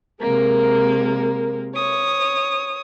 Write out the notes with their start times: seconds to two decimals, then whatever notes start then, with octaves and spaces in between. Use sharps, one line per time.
0.21 C3 G#3 A#3 A#4
1.75 C#5 D#6